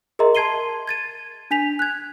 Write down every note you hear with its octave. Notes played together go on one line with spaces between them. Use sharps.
G#4 A#4 D#5 E5 A#5 C6
A5 C6 G#6 C7 D#7 G7
G#6 A6 D#7
D4 G#5 B6 F7
F#6 G#6